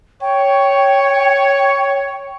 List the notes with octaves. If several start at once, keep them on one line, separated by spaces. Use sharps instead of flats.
C#5 G5